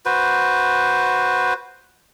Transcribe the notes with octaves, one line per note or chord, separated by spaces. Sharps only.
F#4 B4 C5